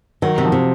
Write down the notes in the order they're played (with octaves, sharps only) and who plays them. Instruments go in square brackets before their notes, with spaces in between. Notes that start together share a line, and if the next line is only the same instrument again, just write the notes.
[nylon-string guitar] D#3 [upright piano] F#3
[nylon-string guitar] C3
[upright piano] F3
[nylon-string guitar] C3